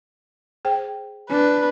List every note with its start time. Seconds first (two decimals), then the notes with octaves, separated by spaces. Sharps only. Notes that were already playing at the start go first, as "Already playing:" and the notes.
0.65 G#4 C5 G5
1.30 D4 B4